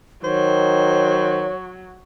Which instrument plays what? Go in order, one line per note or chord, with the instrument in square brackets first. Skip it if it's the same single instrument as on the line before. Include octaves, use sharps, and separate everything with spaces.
[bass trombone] D#3 [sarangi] F#3 [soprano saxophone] C5 [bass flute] C#5